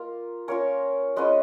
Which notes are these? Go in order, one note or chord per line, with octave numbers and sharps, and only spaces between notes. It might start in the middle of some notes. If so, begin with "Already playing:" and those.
Already playing: A#3 F4
A#3 C#4 F4 A#4 C#5
G#3 C#4 F4 B4 D#5